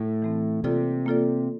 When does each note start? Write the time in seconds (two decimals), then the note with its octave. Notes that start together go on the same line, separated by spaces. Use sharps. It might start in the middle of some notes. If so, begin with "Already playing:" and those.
Already playing: A2
0.22 E3 A3 C4
0.64 C3 A#3 F4 A4 D5
1.06 A#3 F4 A4 D5